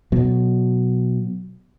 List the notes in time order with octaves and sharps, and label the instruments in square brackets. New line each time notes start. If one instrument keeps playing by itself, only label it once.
[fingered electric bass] B2 F#3